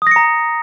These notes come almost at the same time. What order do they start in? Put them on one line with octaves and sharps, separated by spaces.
D#6 A#6 C#7 A#5